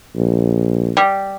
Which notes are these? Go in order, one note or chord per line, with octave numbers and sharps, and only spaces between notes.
A#1
G3